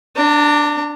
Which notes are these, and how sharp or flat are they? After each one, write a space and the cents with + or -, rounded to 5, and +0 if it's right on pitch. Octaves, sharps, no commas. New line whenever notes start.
D4 +0 A#5 -45